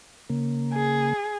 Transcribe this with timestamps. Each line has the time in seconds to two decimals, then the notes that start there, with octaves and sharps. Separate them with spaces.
0.30 C#3 A#3
0.73 G#4